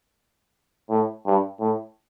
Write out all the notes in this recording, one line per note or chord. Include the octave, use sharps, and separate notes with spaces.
A2
G2
A2